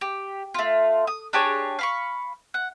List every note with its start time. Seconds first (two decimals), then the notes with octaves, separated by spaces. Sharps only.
0.01 G4
0.54 A3 F4
1.07 D#6
1.33 D4 G4 G#4 C#5
1.79 F5 B5 C#6
2.54 F#5